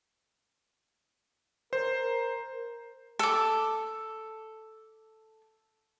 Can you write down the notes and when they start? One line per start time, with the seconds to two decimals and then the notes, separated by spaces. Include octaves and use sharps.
1.73 A#4 C5
3.19 A4 D6